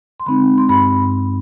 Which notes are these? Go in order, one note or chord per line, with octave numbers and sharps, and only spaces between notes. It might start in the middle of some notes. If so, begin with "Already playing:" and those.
C6
D3 G#3 C4 D#4 B5
C6
G2 B5